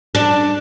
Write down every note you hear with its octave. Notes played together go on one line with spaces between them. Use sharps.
D4